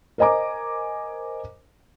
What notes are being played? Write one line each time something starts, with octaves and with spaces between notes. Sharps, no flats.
A#4 C5 D#5 G#5 A#5 D6